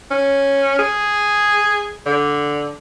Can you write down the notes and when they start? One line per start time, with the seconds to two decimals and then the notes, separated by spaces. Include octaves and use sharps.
0.11 C#4
0.79 G#4
2.06 D3